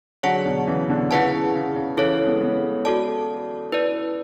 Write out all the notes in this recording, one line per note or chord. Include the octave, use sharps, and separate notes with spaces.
D3 F#3 G#4 C#5 F#5 A5
B2 D3
C#3 E3
B2 D3
C#3 E4 G#4 B4 F#5 A5
C#3
C#3
C#3
C#3 E3 E4 A4 C#5
G#3 B3
G#3 B3
F#4 A4 D5 A5
E4 B4 D5